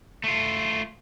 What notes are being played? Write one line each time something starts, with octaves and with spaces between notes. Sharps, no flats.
A3 F4